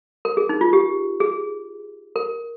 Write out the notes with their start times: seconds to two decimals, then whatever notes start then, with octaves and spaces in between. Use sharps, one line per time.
0.25 A#4
0.37 G#4
0.49 D#4
0.61 F4
0.73 G4
1.20 G#4
2.16 A#4